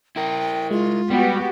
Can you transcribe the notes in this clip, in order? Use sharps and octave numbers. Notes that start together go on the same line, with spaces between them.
E4 A#4 G5
G#3 F4
G3 B3 F#4 G4